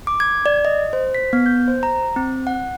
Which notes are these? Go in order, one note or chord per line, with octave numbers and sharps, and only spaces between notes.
D6
G#6
D5
D#5
C5
B6
B3
G6
C5
A#5
C4
F#5